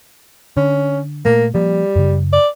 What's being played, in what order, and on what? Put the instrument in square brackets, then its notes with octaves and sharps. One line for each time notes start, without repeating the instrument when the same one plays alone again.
[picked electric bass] D3 [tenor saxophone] C#4
[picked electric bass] A#2 A3 [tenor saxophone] A#3
[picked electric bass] F3 A#3 [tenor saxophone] G3
[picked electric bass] F#2 C#3
[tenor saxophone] D5